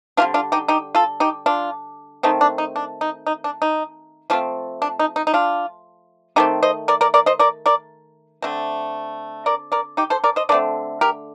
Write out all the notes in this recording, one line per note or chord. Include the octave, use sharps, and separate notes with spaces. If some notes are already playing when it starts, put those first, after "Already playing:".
D3 G3 C4 D4 F4
D4 F4
D#4 G4
D#4 G4
F4 A4
D#4 G4
D4 F4
D#3 A3 C4 D#4
D4
D#4
D4
D#4
D#4
D4
D#4
F3 A3 C4 D4 F4
D4
D#4
D#4
D#4
D4 F4
D#3 A3 C4 D#4 G4
C5 D#5
A#4 D5
A#4 D5
A#4 D5
C5 D#5
A#4 D5
A#4 D5
D3 A3 C4
A#4 D5
A#4 D5
D#4 G4
A4 C5
A#4 D5
C5 D#5
D3 A3 C4 A#4 D5
G4 A#4